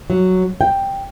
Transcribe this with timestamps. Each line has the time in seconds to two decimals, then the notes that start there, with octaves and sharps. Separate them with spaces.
0.10 F#3
0.61 G5